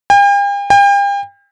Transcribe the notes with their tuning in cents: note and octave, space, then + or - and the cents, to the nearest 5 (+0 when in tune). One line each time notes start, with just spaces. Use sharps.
G5 +45
G5 +40